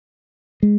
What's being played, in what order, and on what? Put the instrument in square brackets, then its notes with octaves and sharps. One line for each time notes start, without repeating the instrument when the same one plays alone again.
[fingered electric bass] G#3